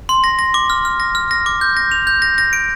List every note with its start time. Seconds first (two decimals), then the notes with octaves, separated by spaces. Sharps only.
0.09 C6
0.24 A#6
0.39 A#6
0.54 D6
0.70 F6
0.85 F6
1.00 A#6
1.15 F6
1.31 A#6
1.46 D6
1.61 G6
1.77 A#6
1.92 F7
2.07 G6
2.22 A#6
2.38 A#6
2.53 D7